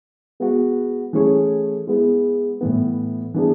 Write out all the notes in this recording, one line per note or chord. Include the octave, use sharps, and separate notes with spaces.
G#3 B3 F#4
E3 A3 C#4 G#4 C#5
G#3 B3 E4
A2 E3 B3
E3 B3 D4 G#4